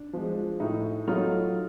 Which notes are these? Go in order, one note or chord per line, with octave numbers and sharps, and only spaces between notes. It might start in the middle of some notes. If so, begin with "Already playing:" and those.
Already playing: D4
F3 G#3
A2 D#4
F#3 A3 D#4 F4